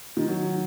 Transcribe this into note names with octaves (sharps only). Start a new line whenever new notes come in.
D#3
F#3